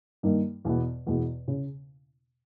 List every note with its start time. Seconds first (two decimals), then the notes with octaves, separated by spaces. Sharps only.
0.23 G2 D#3 A#3 D#4 A#4
0.65 E2 B2 G#3 B3
1.07 E2 B2 G#3 B3
1.48 C#3